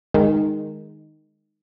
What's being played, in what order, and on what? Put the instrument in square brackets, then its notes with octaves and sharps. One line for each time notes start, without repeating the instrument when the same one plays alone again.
[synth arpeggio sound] D#3 G#3